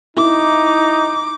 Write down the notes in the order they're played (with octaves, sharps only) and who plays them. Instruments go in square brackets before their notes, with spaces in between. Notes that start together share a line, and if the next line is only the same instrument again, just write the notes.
[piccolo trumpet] D#4 [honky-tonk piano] E4 [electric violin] D6